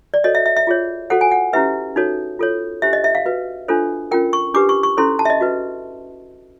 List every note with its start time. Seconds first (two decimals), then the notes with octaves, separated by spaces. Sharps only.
0.14 D5
0.24 F#4 A4 C#5 D#5
0.35 E5
0.46 E5
0.57 E5
0.67 F4 G#4 C#5
1.10 F#4 A4 C5 F#5
1.21 G#5
1.32 F#5
1.53 C#4 E4 G4 B4 E5
1.96 D#4 F#4 A4 C#5
2.39 F4 A4 C#5
2.82 D4 G4 C5 E5
2.93 D#5
3.04 E5
3.15 F5
3.26 F#4 B4
3.68 D4 F4 A4 C5
4.11 C#4 F4 A#4 G5
4.33 C#6
4.54 D4 G4 B4 D6
4.69 C#6
4.83 C#6
4.97 C#4 E4 A4 C5 C6
5.19 A5
5.25 E5
5.30 D#5
5.41 F#4 B4